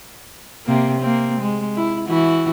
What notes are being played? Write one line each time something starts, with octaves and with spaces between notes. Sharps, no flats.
C3 A#3
A#3 C4
G#3
E4
E3 E4 F#4